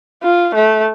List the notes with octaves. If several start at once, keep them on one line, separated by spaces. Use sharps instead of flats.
F4
A3